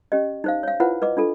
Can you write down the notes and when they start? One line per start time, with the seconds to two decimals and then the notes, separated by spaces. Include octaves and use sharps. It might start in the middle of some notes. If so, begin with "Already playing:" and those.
0.12 C#4 G4 D#5
0.44 D#4 C5 F5
0.63 C#5 F5
0.80 E4 F4 B4 C5 F#5
1.02 B4 D#5 D6
1.17 D4 F4 A4